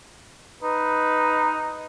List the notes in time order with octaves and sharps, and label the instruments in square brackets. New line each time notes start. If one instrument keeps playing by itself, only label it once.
[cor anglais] D#4 [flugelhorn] B4